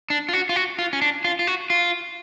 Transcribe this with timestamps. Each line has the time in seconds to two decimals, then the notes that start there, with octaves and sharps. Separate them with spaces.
0.10 D4
0.29 F4
0.33 F#4
0.49 F4
0.56 F#4
0.79 F4
0.93 C#4
1.02 D4
1.24 F4
1.39 F4
1.47 F#4
1.70 F4